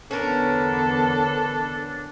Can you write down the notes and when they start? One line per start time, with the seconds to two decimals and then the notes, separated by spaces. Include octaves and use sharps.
0.11 E2 D3 B3 C#4 D4 A4 A#4